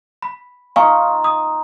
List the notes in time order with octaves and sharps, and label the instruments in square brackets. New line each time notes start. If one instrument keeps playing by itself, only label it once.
[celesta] B5
[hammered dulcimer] D#4 F4 [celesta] F5 G#5 C#6
[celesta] D#6